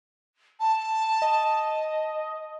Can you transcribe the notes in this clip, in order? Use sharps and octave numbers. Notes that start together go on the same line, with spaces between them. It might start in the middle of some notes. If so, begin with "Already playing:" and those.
A5
D#5